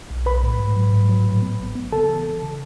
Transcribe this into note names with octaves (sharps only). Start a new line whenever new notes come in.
B1
B1 B4 B5
A2
G#2
F#3
G#2
F#3
A2
B3
A1
B3
C#3 A4 A5
E3
C#3
C#3